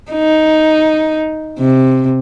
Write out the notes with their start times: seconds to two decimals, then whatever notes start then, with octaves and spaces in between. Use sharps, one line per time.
0.12 D#4
1.59 C3